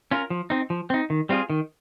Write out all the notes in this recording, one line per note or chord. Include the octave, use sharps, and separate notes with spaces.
C#4 F4 A#4
F3
C4 D#4
F3
C4 D#4
D#3
G3 C4 F4 G#4
D#3